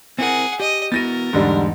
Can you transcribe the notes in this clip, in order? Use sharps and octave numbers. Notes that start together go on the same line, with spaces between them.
C4 E4 G#4 A#4 F#5
G4 D#5
B3 E4 F#4 A#4 A6 A#6 D#7
E2 G#2 D3 G3 D#4